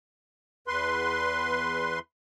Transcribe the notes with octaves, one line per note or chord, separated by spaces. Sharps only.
E2 B4 C6